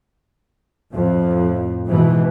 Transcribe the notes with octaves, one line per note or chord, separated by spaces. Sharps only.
F2 A2
G#2 B2 E3